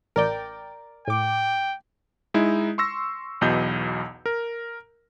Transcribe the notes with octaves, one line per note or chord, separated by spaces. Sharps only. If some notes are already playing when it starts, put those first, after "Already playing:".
A1 A#4 D5 G5
A2 G5 D6
G#3 D#4 E4
C6 C#6 E6 A#6
B1 E2 B2 D#5 G6
A#4